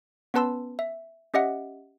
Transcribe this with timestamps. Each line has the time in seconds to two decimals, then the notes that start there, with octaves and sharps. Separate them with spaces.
0.34 B3 C#4 B4 A5 C6 E6
0.79 E5
1.34 C#4 G4 D#5 E5 F#5